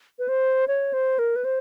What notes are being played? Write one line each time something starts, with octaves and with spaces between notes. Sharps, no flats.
B4
C5
C#5
C5
A#4
B4
C5